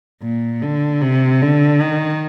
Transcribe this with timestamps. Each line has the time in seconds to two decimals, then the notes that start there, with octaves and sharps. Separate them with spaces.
0.22 A#2
0.62 D3
1.02 C3
1.42 D3
1.81 D#3